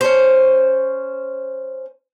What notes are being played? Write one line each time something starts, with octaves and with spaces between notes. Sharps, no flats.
C#4 C5